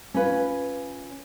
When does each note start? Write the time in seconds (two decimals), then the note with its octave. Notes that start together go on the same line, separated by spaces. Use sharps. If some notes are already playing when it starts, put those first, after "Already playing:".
0.14 C#4 F4 B4